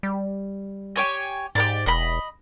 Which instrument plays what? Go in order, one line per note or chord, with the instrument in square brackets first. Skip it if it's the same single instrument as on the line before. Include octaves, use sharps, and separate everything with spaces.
[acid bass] G3
[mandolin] G4 C#5 G#5
[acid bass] G#2 [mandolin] G4 A#4 D5
[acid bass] E1 [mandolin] D#5 B5